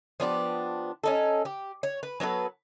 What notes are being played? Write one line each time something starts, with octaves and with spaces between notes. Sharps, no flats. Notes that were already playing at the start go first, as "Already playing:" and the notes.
F3 B3 D4 G4
C#4 D#4 A4
G4
C#5
B4
F#3 B3 A4 B4